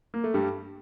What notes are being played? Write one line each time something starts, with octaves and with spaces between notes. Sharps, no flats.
A#3
A3
G2 G3